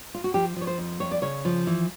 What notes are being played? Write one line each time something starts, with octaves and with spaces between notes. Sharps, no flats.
F4
F#4
F3 G4
F3 C#5
C5
F2
F2 C#5
D5
C#3 C#5
F3
E3